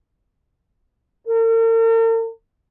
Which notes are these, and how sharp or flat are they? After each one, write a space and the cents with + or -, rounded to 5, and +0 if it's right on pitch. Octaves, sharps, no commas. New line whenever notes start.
A#4 -45